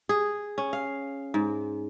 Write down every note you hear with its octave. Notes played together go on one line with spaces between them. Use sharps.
G#4
C#4
F5
G#2